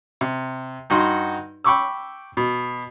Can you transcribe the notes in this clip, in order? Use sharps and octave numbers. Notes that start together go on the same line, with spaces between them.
C3
G2 D#4 F#4 F#5 C6
G5 B5 C#6 D6 E6
B2